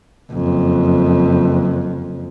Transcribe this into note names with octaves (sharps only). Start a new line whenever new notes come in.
F#1 F2